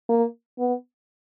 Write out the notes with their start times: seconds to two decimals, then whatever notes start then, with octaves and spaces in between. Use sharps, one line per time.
0.09 A#3
0.59 B3